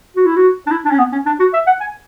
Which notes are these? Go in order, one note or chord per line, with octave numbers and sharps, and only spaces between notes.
F#4
E4
F#4
D4
E4
D4
C#4
B3
C#4
D4
F#4
E5
F#5
G#5